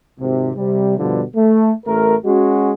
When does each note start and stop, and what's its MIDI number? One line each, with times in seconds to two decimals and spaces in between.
0.20 0.51 32
0.20 0.51 48
0.56 0.96 48
0.56 0.96 55
0.98 1.22 43
0.98 1.22 47
0.98 1.22 50
0.98 1.22 53
0.98 1.22 55
1.36 1.72 57
1.86 2.16 33
1.86 2.16 57
1.86 2.16 70
2.26 2.73 56
2.26 2.73 61
2.26 2.73 66